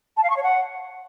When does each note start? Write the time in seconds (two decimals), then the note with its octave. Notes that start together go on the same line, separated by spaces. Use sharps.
0.17 A5
0.23 F5
0.30 C#6
0.36 C#5
0.43 F#5